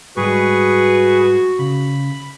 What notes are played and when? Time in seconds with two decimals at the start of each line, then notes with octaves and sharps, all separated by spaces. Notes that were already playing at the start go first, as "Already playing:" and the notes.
0.17 G#2 G3 G#3 F#4 G#4 B4 C#6
1.59 C#3 B5